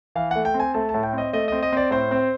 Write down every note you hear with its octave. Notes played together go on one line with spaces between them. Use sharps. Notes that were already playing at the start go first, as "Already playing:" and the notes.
E3 F5
A3 F#5
G5
C4
G#5
A3 A5
A5
A2
G5
C4
D#5
A3 D#5
C4 D#5
D#5
C4 D5
A2 C5
C4